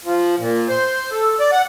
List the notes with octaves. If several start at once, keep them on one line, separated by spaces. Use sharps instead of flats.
F3
A#2
C5
A4
D5
F#5